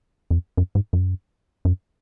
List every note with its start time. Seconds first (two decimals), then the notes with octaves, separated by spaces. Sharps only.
0.31 F2
0.57 F#2
0.75 G#2
0.93 F#2
1.65 F#2